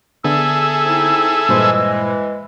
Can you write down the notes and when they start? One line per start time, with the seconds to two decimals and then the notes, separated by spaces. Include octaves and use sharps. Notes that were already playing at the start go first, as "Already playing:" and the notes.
0.24 D3 B3 G#4 A4 E5 E6
0.86 C4 D#4 E4
1.49 G2 A#2 E3 G#3 C5